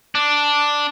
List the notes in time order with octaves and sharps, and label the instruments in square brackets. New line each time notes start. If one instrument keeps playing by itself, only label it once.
[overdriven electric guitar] D4